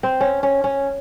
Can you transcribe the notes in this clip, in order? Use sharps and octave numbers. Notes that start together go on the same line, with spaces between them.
C4
C#4
C#4
C#4